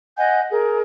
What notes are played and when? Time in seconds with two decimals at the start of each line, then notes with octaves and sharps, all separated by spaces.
0.17 D#5 F#5 G#5 G6
0.51 G#4 A#4